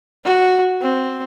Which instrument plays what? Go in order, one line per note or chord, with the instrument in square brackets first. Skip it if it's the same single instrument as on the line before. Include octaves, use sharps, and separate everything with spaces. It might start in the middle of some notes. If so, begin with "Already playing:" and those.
[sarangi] F#4
C4